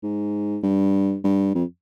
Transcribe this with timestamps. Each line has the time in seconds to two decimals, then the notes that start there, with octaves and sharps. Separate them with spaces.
0.03 G#2
0.63 G2
1.24 G2
1.55 F2